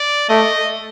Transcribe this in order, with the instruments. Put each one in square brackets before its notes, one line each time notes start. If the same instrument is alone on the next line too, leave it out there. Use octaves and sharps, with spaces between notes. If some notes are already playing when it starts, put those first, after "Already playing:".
Already playing: [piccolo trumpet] D5
[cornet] A3 [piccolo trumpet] D#5